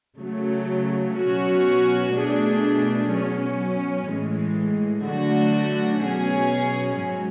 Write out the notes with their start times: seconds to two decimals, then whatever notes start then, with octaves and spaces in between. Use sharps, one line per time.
0.21 C#3 F#3 A3
1.18 B2 F#3 C#4 F#4
2.15 B2 A3 D4 G#4
3.12 B2 F#3 C#4
4.09 A2 E3 G#3
5.06 D3 F#3 A3 D4 F#4
6.02 B2 F#3 C#4 G#4
6.99 G#2 F#3